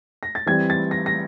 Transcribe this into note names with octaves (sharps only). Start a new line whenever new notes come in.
A#6
A6
E3 G3 C4 G#6
A6
A#6
A#6